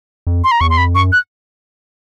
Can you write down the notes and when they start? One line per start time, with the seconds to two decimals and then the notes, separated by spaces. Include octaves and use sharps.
0.27 F2
0.44 C6
0.51 A#5
0.61 E2 C#6
0.70 C6
0.78 F2 B5
0.95 F#2 C#6
1.12 F#6